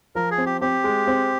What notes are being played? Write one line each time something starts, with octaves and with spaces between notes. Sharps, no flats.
F3 A#4
G#4
C4
G4
C4 G4
G#3
C4